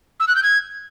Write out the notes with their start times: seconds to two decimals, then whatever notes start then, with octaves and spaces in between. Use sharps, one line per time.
0.20 E6
0.28 F#6
0.35 G6
0.43 G#6